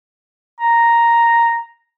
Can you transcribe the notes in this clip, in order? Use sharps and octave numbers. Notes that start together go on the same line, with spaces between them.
A#5